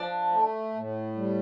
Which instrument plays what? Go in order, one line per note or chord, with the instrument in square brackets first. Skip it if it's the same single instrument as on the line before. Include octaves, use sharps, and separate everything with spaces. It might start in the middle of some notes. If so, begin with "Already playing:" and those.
Already playing: [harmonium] F3 [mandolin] D4
[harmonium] A3
A2
G3